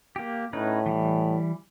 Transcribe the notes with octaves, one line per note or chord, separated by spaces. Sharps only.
A#3 G4
A2 C#4 D#4 B4
E3 G3